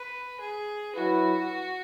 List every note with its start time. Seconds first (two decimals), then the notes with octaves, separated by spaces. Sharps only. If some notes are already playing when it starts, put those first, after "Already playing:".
Already playing: B4
0.40 G#4
0.95 F#3 E4 F#4 B4